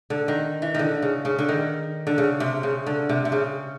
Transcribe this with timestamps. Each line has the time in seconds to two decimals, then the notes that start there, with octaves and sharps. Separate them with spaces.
0.10 D3
0.28 D#3
0.62 E3
0.74 D3 D#3
1.02 C#3
1.25 C#3
1.39 D3
1.49 D#3
2.07 D3
2.18 C#3
2.40 C3
2.63 C#3
2.86 D3
3.09 C3
3.25 C3
3.32 C#3